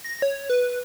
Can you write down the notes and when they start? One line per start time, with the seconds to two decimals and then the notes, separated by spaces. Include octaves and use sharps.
0.04 A#6
0.22 C#5
0.50 B4